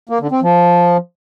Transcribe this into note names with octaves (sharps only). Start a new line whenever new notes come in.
A#3
D3
C4
F3